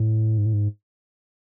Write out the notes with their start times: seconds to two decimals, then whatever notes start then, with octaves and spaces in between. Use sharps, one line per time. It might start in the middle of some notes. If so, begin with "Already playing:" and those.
Already playing: A2
0.38 G#2
0.46 A2
0.53 G#2